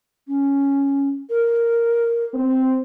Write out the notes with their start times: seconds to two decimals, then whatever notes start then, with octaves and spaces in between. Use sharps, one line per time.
0.28 C#4
1.30 A#4
2.34 C4